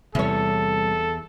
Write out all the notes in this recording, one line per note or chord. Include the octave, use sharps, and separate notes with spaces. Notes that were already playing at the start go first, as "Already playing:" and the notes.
E2 C3 G3 A4 C#5